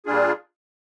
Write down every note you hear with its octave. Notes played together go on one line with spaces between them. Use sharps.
A#2 G3 D4 F4 G#4